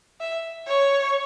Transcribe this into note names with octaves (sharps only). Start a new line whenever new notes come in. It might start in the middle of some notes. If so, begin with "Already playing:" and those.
E5
C#5